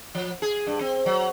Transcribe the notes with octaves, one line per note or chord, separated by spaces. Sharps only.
F3
G#4
G2
C4
F#3